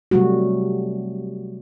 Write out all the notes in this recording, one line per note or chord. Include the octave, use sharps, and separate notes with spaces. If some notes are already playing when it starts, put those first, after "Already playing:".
C3 F#3 G3 A3 F#4